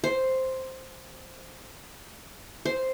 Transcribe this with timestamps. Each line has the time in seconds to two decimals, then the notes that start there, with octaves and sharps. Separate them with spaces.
0.04 C5
2.65 C5